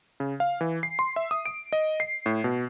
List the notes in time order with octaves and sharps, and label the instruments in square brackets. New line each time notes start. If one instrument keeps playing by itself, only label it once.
[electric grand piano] C#3
F5
E3
C7
C6
E5
D#6
D7
D#5
C7
A2
B2